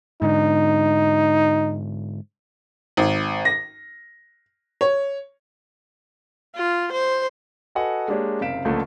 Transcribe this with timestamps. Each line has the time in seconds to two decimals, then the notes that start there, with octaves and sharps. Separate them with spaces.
0.22 G#2 D3 D#4
2.97 G#1
3.45 A#6
4.81 C#5
6.56 F4
6.93 C5
7.75 F#4 A4 B4 D#5 F#5 G#5
8.08 G#3 A#3 D4 G4 G#4 C#5
8.41 F#1 C3 F5 B6 D7 E7
8.65 C#2 D3 F3 A3 A#3